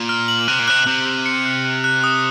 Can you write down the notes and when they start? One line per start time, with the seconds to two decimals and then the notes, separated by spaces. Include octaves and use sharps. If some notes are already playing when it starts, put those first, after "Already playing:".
Already playing: A#2
0.09 F6
0.28 F#7
0.48 C3 F#6
0.59 A#2
0.68 C3 F#6
0.87 C3 F#6
1.06 F#6
1.26 C#7
1.45 F#6
1.65 F#6
1.84 F#6
2.04 D#6